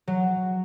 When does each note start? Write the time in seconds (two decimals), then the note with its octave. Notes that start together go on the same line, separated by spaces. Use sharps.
0.07 F#3